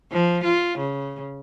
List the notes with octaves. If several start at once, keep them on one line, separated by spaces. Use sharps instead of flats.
F3
F4
C#3